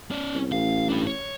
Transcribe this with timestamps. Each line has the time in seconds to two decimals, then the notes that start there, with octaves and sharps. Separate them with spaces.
0.11 C#4 D5
0.34 C2
0.52 A1 F5
0.89 D4 B4
1.07 C#5